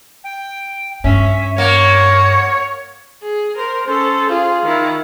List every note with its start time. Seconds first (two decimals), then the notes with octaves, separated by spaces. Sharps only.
0.24 G5
1.04 G2 C#4 E5
1.58 A#3 C#5 F#5
3.23 G#4
3.57 A#4 C5
3.87 C#4 A4 C5
4.30 F4 G#4
4.64 D#3 E4